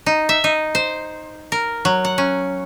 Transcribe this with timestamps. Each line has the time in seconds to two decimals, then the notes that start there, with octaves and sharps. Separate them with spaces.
0.06 D#4
0.29 E5
0.44 D#4
0.75 C5
1.52 A#4
1.85 F#3
2.05 F#5
2.18 C#4